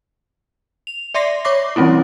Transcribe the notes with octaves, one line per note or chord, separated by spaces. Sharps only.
F7
D5 E5 C6 A#6 C7
C#5 C#6 D6 A#6
E3 G3 C4 C#4 E4